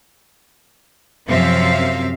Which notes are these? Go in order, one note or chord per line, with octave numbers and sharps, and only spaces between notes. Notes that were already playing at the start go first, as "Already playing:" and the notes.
F#2 C3 F3 C4 E5 F5